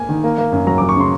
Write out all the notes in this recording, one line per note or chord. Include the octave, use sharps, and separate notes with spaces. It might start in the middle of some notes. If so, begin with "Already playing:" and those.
Already playing: A#3 G#5
D#3
A#3
A#3
F#2
F#3 A#5
F#3 D6
C#6
C#3 C6